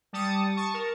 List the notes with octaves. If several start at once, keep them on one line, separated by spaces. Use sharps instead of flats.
G3 A5 D#6 C#7
A5 C#6
A#4